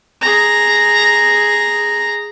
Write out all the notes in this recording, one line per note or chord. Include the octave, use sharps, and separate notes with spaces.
G#4 A#5